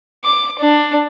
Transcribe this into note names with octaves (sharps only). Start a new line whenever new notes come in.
D6
D4